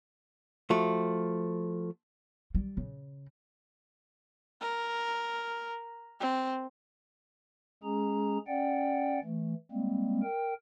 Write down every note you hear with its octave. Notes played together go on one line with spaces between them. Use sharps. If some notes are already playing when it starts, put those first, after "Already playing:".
F3 A3 F#4
G3
C#3
A#4
C4
G#3 C#4 G#4 A#5
C#4 D5 F#5 G5
E3 A3
G3 G#3 A#3 C4
A#4 G5